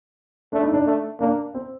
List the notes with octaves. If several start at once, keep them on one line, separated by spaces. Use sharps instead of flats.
A3 D4
D#4
D4
A3
A#3 D4
C4